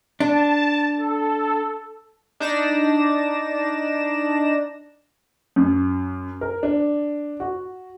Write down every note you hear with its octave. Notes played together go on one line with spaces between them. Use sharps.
D4 A5
A4
D4 D#4 D5 A#6 E7
F#2
A#4
D4
F#4